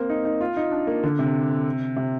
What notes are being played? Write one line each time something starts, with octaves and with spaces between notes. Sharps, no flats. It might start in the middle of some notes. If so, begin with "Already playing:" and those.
Already playing: A#3 C4
D#4
D#4
F4
D#4
D4
A#3
D3
C3
C3